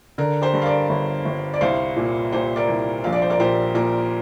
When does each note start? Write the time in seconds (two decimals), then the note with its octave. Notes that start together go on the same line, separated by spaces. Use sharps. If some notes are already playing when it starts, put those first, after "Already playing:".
0.18 D3 A#4
0.42 G4 C5
0.53 G2
0.62 F5
0.66 A#4 D5
0.89 G1
1.25 G1
1.54 D5
1.61 C2 C5 F5
1.97 A#2
2.32 A#2 G4 C5
2.56 A#4 D5
2.68 C2
3.04 A#1 F5
3.12 D5
3.22 C5
3.30 A#4 D5
3.39 A#2 G4 C5
3.75 A#2 A#4